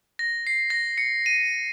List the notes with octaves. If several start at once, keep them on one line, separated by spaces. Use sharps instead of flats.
A#6
C7
A#6
C#7
D#7